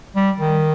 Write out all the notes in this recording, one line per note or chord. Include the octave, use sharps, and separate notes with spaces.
G3
D#3